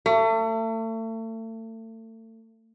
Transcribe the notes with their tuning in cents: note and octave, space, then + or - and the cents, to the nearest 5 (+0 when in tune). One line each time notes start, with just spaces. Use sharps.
A3 +35